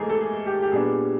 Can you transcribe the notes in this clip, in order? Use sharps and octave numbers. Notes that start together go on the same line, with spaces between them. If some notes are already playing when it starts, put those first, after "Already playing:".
Already playing: G#2 E3 G3 A3 A#3 G#4 A#4
A4
G#4
G4
G4
A#2 G3 B3 D4 G#4